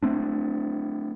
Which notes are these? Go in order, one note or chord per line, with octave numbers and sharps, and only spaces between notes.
A3 C4 D4